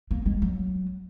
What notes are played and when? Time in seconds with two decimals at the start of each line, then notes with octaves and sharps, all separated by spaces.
0.11 A#3
0.26 G#3
0.42 F#3